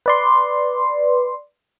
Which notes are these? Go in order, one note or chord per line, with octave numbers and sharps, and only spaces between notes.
B4 D5 C6